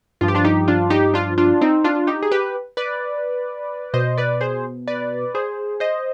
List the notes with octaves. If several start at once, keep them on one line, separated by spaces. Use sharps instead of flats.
G2 F3 F4
G4
D4 F4
D#4 G4
D4 F4
D#4 G4
D4 F4
D4 F4
C4 D#4
D4 F4
D#4 G4
G#4
G4 B4
B4 D5
B2 C5 D#5
B4 D5
G#4 C5
B4 D5
G#4 C5
C5 D#5